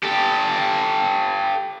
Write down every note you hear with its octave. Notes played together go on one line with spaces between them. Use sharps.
G4 A4